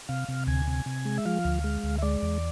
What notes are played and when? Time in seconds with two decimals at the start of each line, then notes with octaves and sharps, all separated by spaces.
0.09 C3 F5
0.28 C3
0.47 D2 G#5
0.67 C3
0.86 C3
1.05 G#3
1.18 E5
1.26 F3 F5
1.44 D2
1.64 G#3
1.83 D2
1.98 E5
2.02 G#3 D5
2.22 E2